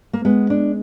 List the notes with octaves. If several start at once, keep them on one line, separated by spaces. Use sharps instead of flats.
A#3
G#3 B3
D4